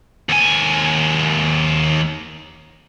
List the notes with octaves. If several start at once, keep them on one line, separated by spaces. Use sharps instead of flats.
D#2 G#5